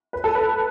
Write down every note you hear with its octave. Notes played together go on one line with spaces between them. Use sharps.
B4
A4
B4